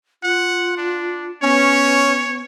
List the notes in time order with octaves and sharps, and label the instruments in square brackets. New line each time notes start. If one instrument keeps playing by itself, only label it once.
[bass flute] F4 [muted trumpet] F#5
[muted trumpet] D4
[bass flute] B3 [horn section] C#4 [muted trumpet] C#5